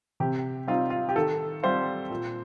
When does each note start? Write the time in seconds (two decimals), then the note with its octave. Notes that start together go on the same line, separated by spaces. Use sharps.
0.20 C3 G4
0.67 G3 C4 D#4 F4
0.90 F4
1.09 G4
1.16 D#3 A4
1.63 G3 C4 F4 C5
2.10 A#2